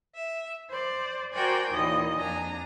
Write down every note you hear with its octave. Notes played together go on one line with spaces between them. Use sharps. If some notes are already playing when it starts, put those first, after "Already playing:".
E5
C5 D5
F#4 A#4 C5 D5 G5 G#5
D#2 A#2 E3 D#5
F2 D4 G#5 A#5